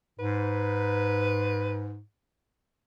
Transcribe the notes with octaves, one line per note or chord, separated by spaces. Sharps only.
G#2 B4